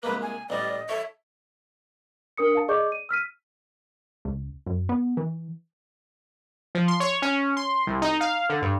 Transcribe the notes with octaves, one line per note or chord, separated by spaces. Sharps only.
C2 G#3 A#3 B4
G#5
A1 G3 D5 D#5
A4 C#5 E5
D4 A#4 D#6 C#7
F5 A5
G#4 D5 D#5 C#6 D6 G6
D#7
E6 F6 B6 D#7
C#2
F#2
B3
E3
F3
C6
C#5
C#4
C6
C2
D#4
F5
D3
G2